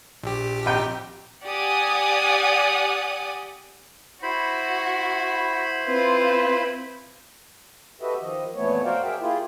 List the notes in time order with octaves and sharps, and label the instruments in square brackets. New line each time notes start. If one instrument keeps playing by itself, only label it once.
[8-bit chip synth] A#1 G4
[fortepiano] G#1 G5 A#5
[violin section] G4 D5 F#5 G#5 D#6
[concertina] E4 C5 B5 [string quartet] F#4
[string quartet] C4 F4 B4
[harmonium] F#4 G4 A4 B4 D#5 E5
D#3 F3 D#5
F2 A#2 E3 A3 B3 C#5
F#4 A#4 C5 D5 F5 G5
G#4 A#4 E5 G5
A#3 E4 F4 G4 G#4